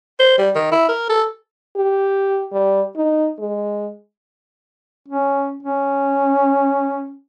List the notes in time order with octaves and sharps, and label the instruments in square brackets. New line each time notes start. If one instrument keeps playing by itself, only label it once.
[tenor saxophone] C5
G3
D#3
E4
A#4
A4
[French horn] G4
G3
D#4
G#3
[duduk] C#4
C#4